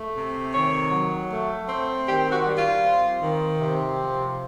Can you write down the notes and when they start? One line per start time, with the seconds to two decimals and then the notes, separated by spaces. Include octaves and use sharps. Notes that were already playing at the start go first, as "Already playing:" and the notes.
Already playing: A3
0.15 C3
0.53 D#3 C#5
0.91 F#3
1.30 A3
1.69 C4
2.07 D#3 G4
2.32 F#4
2.44 G3
2.58 F4
2.84 C4
3.21 D#3
3.59 C3
3.98 F3